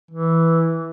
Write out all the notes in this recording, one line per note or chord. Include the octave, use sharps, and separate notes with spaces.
E3